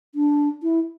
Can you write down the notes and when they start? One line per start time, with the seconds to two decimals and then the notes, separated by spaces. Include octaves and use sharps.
0.15 D4
0.63 E4